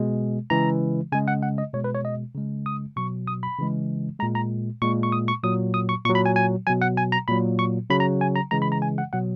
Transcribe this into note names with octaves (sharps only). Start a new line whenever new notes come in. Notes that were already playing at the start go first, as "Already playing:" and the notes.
Already playing: B2 G#3
C#3 E3 G#3 A#5
C#3 G#3 G#5
F#5
F#5
D#5
B2 G#3 C#5
B4
C#5
D#5
C#3 G#3
D#6
B2 F#3 C#6
D#6
B5
C#3 E3 G#3
A#2 G#3 A#5
A#5
A#2 G#3 C#6
C#6
D#6
C#6
A#2 F#3 D#6
D#6
C#6
A#2 F#3 C#6
B5
G#5
G#5
B2 F#3 G#5
F#5
G#5
A#5
A#2 F#3 B5
C#6
C#3 F#3 B5
A#5
G#5
A#5
C#3 E3 G#3 A#5
B5
A#5
G#5
F#5
B2 F#3 F#5